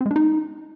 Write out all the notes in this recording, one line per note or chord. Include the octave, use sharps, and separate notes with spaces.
C4
G#3
D4
D#4